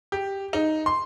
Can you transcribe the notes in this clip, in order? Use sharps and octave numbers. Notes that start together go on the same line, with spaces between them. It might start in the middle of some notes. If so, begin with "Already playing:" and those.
G4
D#4
C6